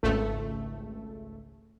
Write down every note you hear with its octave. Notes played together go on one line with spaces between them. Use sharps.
G#1 C#2 A3